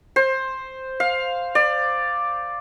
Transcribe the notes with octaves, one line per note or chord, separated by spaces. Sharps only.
C5
F5
D5